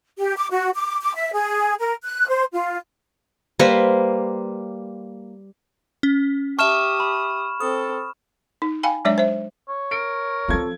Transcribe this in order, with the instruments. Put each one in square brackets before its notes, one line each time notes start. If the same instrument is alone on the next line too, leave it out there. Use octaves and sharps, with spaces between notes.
[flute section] G4
D6
F#4
D6
D6
E5
G#4
A#4
F#6
C5
F4
[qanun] G3 A#3 B4 C5
[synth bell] C#4
[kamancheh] G4 D#6 [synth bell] E5 A5 [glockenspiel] C#6 F6 E7
[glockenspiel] B5
[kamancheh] C4 A4 [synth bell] D#6
[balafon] D#4
F5 G5 G#5 B5
F#3 G#3 D4 C#5 D5 E5
C5 E5
[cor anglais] C#5
[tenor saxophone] A#4 [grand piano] D7
[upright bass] F3 C4 [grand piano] F4 A4 G#6